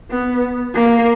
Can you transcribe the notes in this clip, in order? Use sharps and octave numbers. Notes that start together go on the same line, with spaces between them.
B3
A#3